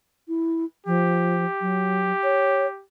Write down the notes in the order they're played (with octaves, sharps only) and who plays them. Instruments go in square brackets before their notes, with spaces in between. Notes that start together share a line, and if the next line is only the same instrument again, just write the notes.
[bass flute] E4
[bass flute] F3 [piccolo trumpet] G4
[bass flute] F#3
C#5